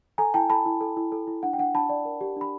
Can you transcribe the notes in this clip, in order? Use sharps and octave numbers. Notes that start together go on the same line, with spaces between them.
A4 G#5 A#5
E4 G5 A5
A4 A5 B5
E4
A4
E4
A4
E4
D4 F#5
G5
D4 F#5
D4 A5 B5
D5
A#4
G4
D4 B5